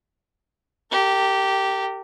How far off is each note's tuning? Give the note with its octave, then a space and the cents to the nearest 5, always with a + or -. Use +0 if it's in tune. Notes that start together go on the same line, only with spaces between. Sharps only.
G4 -10 A#4 -40